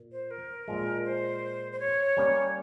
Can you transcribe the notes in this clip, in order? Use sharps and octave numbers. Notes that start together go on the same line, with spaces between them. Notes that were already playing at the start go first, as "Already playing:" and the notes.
Already playing: A#2
C5
A#4
A#2 F3 G#3
C5
C5
C#5
G3 A#3 C#4 G4